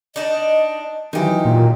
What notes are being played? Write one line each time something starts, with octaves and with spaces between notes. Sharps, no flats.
D4 D#4 D5 D#5
D#3 E3 F#3 D#4 G4
A#2